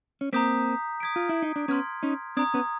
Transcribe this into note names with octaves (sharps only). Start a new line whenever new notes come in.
C#4
A#3 C4 A#5 D#6 G6 B6
D#6 G#6 B6 D7
F4
E4
D#4
D4
B3 C#4 C6 F6 G#6
C#4 D#4
C4 D4 A#5 D#6 G#6
B3 C#4